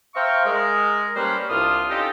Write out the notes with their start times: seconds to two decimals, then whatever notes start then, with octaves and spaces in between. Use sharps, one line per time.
0.15 C5 E5 F5 G5 A#5 C#6
0.45 G#3 A#4
1.16 G3 A#3 C#4 B4 C5
1.49 C2 C3 D4 F4 D#6 F6
1.90 C#4 D#4 F4 G4 A4 D#5